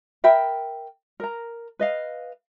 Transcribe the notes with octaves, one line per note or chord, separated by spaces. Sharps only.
A#4 E5 G5 B5
A#4 A#5
B4 D#5 F5